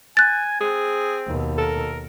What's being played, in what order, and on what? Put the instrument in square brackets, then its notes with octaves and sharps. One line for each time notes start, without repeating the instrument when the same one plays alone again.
[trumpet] G#5 [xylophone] F#6 A6
[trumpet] C4 [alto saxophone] G#4
[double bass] D#2 B2
[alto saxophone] A4 [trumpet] A#4